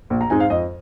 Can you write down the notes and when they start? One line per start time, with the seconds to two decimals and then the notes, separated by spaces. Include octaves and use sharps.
0.10 A#1
0.21 A#5
0.30 G#2 G#3 C4 D#4 G#5
0.40 F5
0.50 F2 D#5